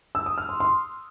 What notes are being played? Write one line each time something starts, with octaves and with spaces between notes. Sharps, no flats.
E6
D#6
F6
C6
C6